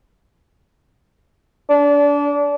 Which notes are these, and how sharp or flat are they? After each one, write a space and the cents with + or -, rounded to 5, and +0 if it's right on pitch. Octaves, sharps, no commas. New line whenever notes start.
D4 -30